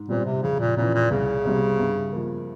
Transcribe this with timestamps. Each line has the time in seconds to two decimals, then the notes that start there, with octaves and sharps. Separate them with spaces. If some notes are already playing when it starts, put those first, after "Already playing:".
Already playing: G#2
0.08 A#2 G3 C4
0.25 C3
0.43 F2 C#3
0.60 A#2
0.77 A#2 C#3 E3
0.94 A#2
1.11 C2 C#3
1.45 C3 G3 C4
1.79 G2
2.13 F3 A#3